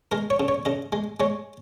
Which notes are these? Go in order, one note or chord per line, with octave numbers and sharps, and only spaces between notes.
G#3 A#4
C#5
C#3
C#5
C#3 D#5
G#3
G#3 C#5